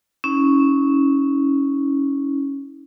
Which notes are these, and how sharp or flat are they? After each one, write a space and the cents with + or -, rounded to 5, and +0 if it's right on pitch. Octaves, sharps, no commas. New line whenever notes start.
C#4 +0 E4 -45